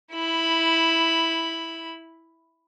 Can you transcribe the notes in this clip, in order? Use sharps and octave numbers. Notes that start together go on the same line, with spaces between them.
E4 B5